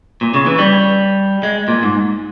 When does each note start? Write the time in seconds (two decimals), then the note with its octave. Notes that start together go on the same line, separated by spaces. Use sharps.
0.21 A#2
0.34 C#3
0.46 E3
0.59 G3
1.43 G#3
1.68 A#2
1.83 G#2